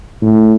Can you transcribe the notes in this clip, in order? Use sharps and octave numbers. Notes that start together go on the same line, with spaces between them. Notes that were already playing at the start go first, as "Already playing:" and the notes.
A2